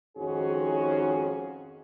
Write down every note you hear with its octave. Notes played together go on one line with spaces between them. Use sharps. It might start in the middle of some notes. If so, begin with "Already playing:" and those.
F2 G#2 D#3 C#4 F#4 G#4